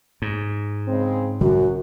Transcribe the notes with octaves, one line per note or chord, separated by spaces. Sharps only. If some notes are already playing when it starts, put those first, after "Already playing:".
G#2
C#3 G#3 C4
B1 F#2 D3 G3 F#4